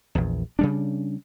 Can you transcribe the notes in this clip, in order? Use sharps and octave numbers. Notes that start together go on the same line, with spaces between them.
A#1 E2
C#3 G3 D4